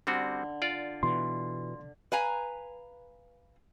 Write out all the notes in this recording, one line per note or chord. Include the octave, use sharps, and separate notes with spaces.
D3 G3 C4 F#4
F4 D5
B2 E3 C6
B4 F5 G#5 A#5